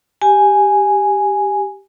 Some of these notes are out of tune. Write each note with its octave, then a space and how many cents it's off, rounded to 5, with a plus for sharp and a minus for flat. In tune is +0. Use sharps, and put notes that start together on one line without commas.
G4 +0 G#5 +0